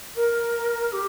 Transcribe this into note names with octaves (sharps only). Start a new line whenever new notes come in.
A#4
G4